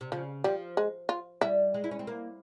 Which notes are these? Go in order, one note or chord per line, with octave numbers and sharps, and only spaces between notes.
C3
C#3 F3
F3 G3
G#3
F4
G3 E4
G#3
E4
C#4
C4
A#3